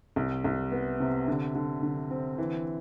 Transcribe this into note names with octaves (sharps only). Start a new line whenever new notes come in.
C2
C2
B3
C3
D3
D3
D3
C4
E3